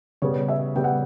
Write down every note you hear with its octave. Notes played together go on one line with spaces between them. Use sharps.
C#3 G3 B3 C#5
E5
C#3 G3 B3 G5
F#5